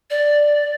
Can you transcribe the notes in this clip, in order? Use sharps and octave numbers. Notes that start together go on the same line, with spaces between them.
D5